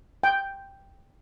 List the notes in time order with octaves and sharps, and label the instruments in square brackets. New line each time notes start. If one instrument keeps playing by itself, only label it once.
[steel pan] G5